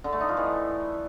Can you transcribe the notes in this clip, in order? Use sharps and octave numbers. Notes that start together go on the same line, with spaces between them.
D3
A3
D#4
F3
E3